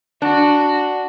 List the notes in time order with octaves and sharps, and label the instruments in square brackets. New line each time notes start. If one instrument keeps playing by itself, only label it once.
[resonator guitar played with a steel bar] D4 [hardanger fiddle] F#4